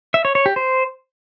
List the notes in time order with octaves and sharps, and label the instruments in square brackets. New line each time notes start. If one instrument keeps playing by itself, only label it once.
[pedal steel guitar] E5
C#5
C#5
G4
C5